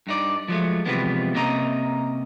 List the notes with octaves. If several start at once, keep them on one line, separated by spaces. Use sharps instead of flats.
G2 D#4 D5
F3 F#3 G#3 A3
C3 E3 F3 G3 G#3 B3
C3 A#3 C#4 D#5 A#5